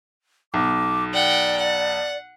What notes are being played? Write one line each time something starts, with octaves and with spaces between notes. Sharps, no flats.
B1 D6
D5 F#5 G5
F#5